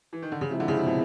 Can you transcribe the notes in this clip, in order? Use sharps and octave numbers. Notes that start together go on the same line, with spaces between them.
E3
D#3
D3
C#3
C3 F3 G#3 C4 E4
D3
C#3
C3
B2